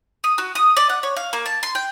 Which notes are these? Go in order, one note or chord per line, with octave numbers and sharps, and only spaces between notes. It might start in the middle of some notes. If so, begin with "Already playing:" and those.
D#6
F#4
D#6
D5
F#5
C#5
F5
A#3
A5
C6
G5